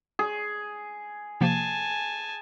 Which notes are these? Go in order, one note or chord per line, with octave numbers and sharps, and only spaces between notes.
G#4
C3 F3 A#3 G#5 A5